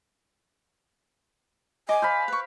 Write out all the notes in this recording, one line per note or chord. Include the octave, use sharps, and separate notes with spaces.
D#5 G#5 D6
C5 F5 B5
B4 C#6